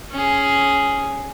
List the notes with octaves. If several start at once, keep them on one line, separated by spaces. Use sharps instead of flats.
C#4 G#4